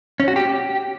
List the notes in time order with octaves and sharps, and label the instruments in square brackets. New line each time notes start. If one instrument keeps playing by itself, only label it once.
[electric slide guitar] C#4
F#4
G4